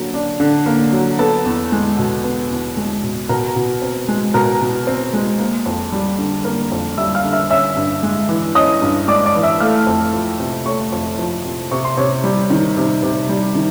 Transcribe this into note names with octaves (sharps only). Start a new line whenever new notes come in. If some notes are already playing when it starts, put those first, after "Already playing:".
Already playing: D3 F#3 A#3
D4
D3
A#3
F#3
B3 A4 A5
E2
G#3
B2
B3
E2
G#3
B2
B2 A#4 A#5
B2
C4
G#3
B2 A#4 A#5
B2
C4
G#3
A#3
F2
G3
D3
A#3 A#4 A#5
F2
G3 E5 E6
F5 F6
D3
E5 E6
C#4 E5 E6
G2
G#3
E3
C#4 D#5 D#6
G2
G#3 D5 D6
D5 D6
E3
E5 E6
A3 F5 F6
F2
F3
C3
A3 C#5 C#6
F2
F3
C3
C3 C#6
C6
C3 C#5 C#6
G3
D#3
C3
C3
G3
D#3